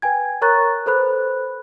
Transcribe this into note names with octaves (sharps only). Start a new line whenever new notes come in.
B4 G5 G#5 G#6
A#4 C#5 A#5 C#6 F#6 A6
A4 B4 C5 B5 F#6